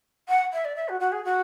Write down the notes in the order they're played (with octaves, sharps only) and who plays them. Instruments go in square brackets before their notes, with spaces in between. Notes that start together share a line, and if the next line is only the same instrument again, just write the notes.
[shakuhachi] F#5
E5
D5
E5
F#4
F#4
G#4
F#4